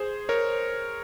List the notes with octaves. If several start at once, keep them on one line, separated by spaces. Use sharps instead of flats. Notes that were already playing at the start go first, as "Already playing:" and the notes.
Already playing: G#4 C5
A#4 C#5